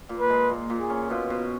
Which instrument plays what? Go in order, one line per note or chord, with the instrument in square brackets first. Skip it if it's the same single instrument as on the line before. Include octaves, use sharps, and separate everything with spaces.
[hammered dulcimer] A#2
[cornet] B4
[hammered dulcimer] G#3
A#2
A#2
[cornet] G#4
[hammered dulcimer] C#4
[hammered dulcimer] B2 [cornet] F4
[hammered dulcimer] B2